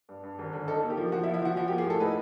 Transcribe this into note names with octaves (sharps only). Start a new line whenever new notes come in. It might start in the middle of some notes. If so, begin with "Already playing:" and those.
G2
G2
G#1
D3
D#4 A4
A#3
G4
F3
F3 F#4
E4
F3
E4
F3 F#4
F3 F#4
G4
A#3
G#4
A2 A4
D#4 B4